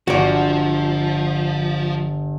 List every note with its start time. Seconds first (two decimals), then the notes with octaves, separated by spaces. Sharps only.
0.07 G1 F3 F#4 D5